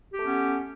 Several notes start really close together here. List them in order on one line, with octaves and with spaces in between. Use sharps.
G4 A3 C#4 B3